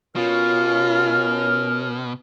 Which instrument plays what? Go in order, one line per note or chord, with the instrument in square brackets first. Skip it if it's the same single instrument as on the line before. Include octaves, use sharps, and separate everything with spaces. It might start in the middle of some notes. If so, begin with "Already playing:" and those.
[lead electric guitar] B2 [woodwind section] C#4 A#4 F6 [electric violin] F4